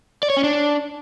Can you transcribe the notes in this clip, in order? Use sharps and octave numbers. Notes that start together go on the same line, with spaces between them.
D5
C#5
C#4
D4